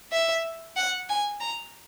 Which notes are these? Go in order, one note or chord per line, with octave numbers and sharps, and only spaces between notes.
E5
F#5
G#5
A#5